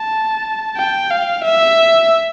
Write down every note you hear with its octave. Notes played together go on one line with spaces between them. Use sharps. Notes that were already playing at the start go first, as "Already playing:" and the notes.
Already playing: A5
G5
F5
E5